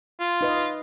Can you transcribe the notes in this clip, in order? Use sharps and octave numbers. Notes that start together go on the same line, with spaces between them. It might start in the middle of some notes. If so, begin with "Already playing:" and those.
F4
D#4 B4 D#5